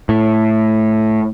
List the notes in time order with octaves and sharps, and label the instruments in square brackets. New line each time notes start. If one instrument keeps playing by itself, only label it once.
[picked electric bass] A2